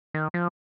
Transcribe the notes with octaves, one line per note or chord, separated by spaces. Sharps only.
D#3
F3